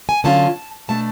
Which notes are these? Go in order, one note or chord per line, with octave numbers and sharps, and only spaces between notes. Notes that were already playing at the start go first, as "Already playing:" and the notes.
G#5
D3 F#3 C#4 F4 A5
B2 A3 D4 A5